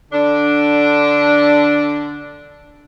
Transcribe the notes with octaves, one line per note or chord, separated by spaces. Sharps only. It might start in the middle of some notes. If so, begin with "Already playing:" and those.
D3 D4